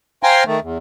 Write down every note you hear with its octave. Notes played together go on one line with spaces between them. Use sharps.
C5 F5 G5 G#5 A#5 C6
D#3 A3
E2